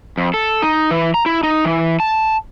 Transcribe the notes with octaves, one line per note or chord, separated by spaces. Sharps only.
F2
A4
D#4
E3
A#5
E4
D#4
E3
A5